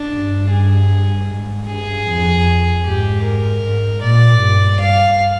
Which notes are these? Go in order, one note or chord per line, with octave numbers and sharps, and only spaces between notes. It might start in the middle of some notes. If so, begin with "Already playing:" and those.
Already playing: D4
G2
G#4
G#2
G2 G#4
F2
G#2 G4
A#4
G#2
A#2 D5
G2
G2 F5